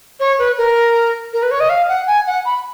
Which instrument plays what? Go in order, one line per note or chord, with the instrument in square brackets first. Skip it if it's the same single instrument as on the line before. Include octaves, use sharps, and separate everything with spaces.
[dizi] C#5
B4
A#4
A#4
B4
C#5
D#5
F5
F#5
G#5
F#5
B5